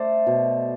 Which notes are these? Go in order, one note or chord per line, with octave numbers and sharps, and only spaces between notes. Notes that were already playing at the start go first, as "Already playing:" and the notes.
Already playing: A3 C5 D5
B2